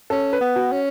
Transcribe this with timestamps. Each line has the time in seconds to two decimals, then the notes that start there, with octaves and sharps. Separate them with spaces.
0.10 C#4 A4
0.33 B4
0.41 B3
0.56 F#4
0.72 C#4